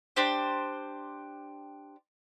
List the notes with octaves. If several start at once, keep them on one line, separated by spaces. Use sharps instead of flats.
D4 G4 C5